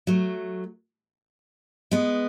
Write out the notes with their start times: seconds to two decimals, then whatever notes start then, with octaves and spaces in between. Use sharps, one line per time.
0.07 F#3 A3
1.91 G#3 B3